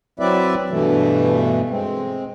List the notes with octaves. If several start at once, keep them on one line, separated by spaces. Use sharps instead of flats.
F#3 C4 E4 B4 D5 E5
G2 B2 E3 A3
G#3 C4